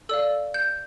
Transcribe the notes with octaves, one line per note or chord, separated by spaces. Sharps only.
A4 D5 F5 E6
G6